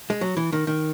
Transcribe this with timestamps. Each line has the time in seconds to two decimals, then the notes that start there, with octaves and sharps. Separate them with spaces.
0.10 G#3
0.21 F#3
0.37 E3
0.52 D#3
0.67 D#3